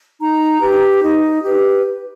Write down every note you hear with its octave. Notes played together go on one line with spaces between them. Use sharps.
D#4 A#5
G4 B4
D#4
G4 B4